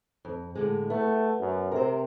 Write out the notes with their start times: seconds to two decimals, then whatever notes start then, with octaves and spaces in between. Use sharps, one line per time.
0.25 F2
0.55 A2 D3 G#3
0.90 A3 B3
1.40 F#2
1.72 C3 A#4 C5